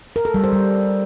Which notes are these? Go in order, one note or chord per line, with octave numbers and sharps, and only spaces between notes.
A#4
A4
G3
C5
G3